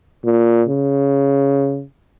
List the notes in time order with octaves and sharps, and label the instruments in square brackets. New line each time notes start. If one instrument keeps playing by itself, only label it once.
[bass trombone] A#2
C#3